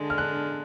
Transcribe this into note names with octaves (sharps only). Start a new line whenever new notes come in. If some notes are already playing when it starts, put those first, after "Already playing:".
Already playing: D3 G#3 D4
F6
F#6